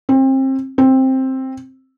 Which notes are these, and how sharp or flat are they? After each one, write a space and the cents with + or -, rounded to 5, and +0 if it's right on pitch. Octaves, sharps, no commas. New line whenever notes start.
C4 +30
C4 +10